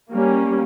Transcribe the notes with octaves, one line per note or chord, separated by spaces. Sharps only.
G3 A#3 C#4